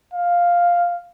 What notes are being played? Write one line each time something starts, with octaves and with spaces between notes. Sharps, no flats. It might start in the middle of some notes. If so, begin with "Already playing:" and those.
F5